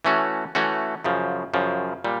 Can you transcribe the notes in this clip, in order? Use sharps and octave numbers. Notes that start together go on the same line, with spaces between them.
E3 A3 C#4 F#4
E3 A3 C#4 F#4
F#2 C#3 F3
F#2 C#3 F3
A#2 G3